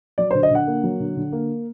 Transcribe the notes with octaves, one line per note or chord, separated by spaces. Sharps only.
F#3 D5
C5
D3
D#5
D3 F#5
A#3
F#3
D3
D3
A#3